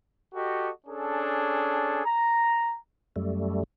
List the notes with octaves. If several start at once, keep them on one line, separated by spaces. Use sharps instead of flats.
F#4 G4 A4 D#5
C#4 D4 G#4 A4
A#5
F#2 G3 A3